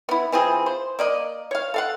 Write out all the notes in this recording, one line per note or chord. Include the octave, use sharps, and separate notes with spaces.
B3 E4
E3 C4 F4 G#4
C5
A#3 D5 D#5
C#5 F5
A4 F5 F#5